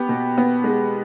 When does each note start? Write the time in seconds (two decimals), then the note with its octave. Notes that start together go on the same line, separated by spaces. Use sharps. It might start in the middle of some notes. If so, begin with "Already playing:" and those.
Already playing: B3 G4
0.09 B2
0.38 B3
0.64 G#3